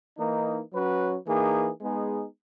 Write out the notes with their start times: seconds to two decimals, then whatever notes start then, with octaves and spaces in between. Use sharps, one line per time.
0.18 E3 A#3 D#4
0.72 F#3 C#4 F#4 B4
1.26 E3 A#3 D#4 G#4
1.80 G#3 B3 D#4 G#4